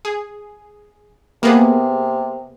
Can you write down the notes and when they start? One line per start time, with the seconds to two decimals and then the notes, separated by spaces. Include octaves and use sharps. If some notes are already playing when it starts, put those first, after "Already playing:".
0.05 G#4
1.43 C3 A#3 B3 G#4